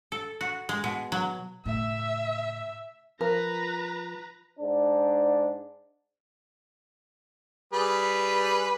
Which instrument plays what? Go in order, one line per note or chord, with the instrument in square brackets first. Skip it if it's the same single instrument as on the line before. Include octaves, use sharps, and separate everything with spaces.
[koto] A4
F#4
G#3
B2
F#3
[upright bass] A2 C#3 [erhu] E5
[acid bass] F3 [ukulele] A#4 [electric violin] B4 A#5
[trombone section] G#2 D4
[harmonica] G3 G#4 B4